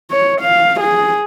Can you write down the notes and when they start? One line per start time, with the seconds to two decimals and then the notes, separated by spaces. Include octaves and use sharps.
0.11 C#5
0.41 F5
0.80 G#4